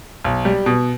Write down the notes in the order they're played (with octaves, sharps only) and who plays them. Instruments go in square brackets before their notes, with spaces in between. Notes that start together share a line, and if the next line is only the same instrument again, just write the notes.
[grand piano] B1
G3
B2